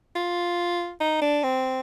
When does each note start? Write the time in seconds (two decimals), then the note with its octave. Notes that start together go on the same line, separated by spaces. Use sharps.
0.15 F4
1.00 D#4
1.22 D4
1.43 C4